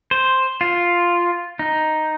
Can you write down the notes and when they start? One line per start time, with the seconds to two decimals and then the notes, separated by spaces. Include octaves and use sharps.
0.11 C5
0.61 F4
1.59 D#4